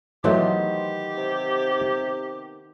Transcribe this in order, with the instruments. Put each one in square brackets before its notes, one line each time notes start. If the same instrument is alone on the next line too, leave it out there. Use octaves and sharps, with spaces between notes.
[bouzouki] D#3 B3 C5 [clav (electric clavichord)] E3 F#3 A3 [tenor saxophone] G4
[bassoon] C3